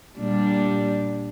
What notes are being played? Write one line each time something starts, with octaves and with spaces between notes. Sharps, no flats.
A#2 G3 D4